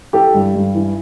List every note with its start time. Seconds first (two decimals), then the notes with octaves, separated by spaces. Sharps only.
0.13 E3 G4 A4
0.34 G2
0.55 G2
0.75 E3